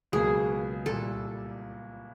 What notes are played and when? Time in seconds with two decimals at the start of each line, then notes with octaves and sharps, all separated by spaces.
0.12 C#2 B2 F#3 A#3 G#4
0.86 C2 A#2 G3 A4